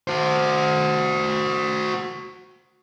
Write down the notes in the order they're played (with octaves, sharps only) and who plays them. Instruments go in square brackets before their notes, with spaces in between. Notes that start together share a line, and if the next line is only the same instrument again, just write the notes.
[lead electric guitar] F#4 C5